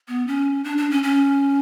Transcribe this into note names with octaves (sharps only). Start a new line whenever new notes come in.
B3
C#4
D4
D4
C#4
C#4